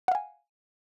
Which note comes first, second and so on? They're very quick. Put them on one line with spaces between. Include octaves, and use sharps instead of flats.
F#5 F5 G#5